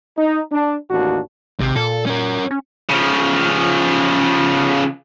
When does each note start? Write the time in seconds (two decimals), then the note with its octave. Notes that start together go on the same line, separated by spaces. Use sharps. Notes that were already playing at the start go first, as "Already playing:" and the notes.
0.17 D#4
0.51 D4
0.91 A1 D#2 D4 F#4
1.60 G#1 C3
1.76 A#2 A4
2.06 C#4 A#4
2.51 C#4
2.89 C#3 F3